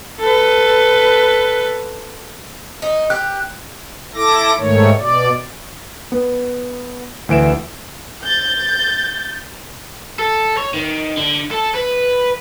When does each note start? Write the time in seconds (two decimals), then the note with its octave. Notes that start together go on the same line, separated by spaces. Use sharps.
0.21 A4 B4
2.82 D#4
3.10 G4 F#6
4.15 E4 A4 D6 A#6
4.58 G#2 D#3 A3 C#5
4.99 B2 D5
6.12 B3
7.29 D2 E3 D7 E7
8.22 G6 A6
10.19 A4
10.58 C#5
10.74 D#3
11.17 D3
11.51 A4
11.75 B4